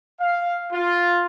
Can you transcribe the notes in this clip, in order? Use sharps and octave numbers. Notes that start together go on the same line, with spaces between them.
F5
F4